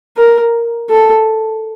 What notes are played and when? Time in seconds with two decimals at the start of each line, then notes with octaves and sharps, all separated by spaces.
0.17 A#4
0.90 A4